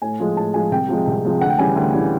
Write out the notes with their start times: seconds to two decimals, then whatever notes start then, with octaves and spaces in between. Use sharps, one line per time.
0.02 A2 G#5
0.20 F3 G#3
0.36 A2 A5
0.54 F3 G#3 G#5
0.71 C2 G5
0.88 C3 F3 G#3
1.07 C2
1.25 C3 F3 G#3
1.41 D2 F#5
1.50 G5
1.58 C#3 E3 G3 G#5
1.76 D2
1.93 C#3 E3 G3